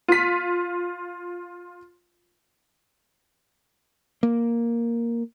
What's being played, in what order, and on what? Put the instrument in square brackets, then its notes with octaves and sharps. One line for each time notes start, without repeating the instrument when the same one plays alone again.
[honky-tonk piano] F4 B6
[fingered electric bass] A#3